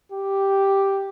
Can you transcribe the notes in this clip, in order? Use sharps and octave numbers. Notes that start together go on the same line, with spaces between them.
G4